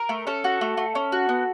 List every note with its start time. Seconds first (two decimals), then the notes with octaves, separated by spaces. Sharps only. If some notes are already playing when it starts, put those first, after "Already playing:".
Already playing: A#4
0.09 A3
0.27 C#4 A4
0.44 F#4
0.61 A3
0.77 A3
0.95 C#4
1.12 F#4
1.29 B3